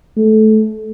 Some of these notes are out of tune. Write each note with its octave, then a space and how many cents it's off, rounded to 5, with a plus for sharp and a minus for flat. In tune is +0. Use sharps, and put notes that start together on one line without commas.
A3 -20